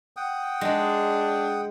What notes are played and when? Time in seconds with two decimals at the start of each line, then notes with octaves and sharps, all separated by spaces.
0.17 F#5 G5 D#6
0.61 G#3 D4